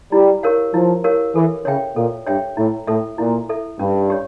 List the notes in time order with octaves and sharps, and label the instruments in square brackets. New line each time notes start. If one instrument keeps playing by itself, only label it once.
[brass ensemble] G3 [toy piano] E4
[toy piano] G4 A#4 C#5 F5
[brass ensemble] F3 [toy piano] E4
[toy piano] G4 A#4 C#5 F5
[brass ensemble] E3 [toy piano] A4
[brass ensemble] C#3 [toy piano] C#5 E5 G5
[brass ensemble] A#2 [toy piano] A4
[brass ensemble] G2 [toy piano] C#5 E5 G5
[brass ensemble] A2 [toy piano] E4
[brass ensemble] A2 [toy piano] A4 E5
[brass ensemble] A#2 [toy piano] E4
[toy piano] A4 E5
[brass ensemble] G2 [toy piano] C#4
[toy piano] G4 C#5